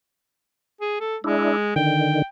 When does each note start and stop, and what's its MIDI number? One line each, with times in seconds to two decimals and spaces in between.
0.81 0.99 68
1.00 1.17 69
1.24 1.75 56
1.24 1.57 62
1.24 1.57 64
1.76 2.22 50
1.76 2.22 51
1.76 2.26 79